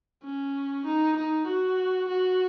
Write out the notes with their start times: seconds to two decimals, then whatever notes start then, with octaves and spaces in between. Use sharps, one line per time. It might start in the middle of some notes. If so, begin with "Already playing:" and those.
0.24 C#4
0.85 D#4
1.16 D#4
1.47 F#4
2.09 F#4